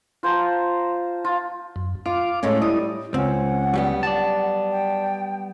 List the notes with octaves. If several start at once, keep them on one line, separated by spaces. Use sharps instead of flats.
F4 C5 A5 A#5
F4
F#2
F4 F5 D6
A2 G#3 C#4
G3 E4 D#6
C#2 C4 C#4 F#5
F#3 G3 B3
D5 A5
G5